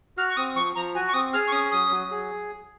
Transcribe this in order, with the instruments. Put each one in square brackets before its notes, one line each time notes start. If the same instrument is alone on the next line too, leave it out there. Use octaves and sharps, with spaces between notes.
[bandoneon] F#4 [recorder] F6
[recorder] C#6
[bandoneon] C4 [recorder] D#6
[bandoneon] F3 [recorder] C#6
[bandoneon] F3 [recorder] A#5
[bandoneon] F#4 [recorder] G#5
[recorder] C#6
[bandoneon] C4 [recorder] D#6
[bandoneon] G#4 [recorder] F6
[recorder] C#6
[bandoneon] C#4 [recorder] D#6
[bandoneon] F#3 [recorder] D#6
[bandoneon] F#3
G#4